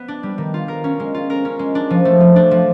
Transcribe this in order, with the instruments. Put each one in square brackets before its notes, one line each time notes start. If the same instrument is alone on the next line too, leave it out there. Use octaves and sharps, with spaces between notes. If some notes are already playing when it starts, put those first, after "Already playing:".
Already playing: [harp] B3
D4
G3
D#3
F4
A#4
C#4
G#3
F4
A#4
C#4
G#3
D4
F3
A3
F3
D4
F3